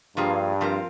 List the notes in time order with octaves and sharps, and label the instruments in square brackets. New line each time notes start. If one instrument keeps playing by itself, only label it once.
[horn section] G2 [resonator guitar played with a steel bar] F3 A#3 F4 G#4
[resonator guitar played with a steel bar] F3 C4 F4 A#4